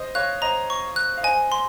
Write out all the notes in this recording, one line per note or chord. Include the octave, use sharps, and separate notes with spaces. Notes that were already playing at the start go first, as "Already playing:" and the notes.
Already playing: C5 D#5
C#5 F5 F#6
C5 D#5 A#5
C#6
F#6
F5
C5 D#5 G#5
C6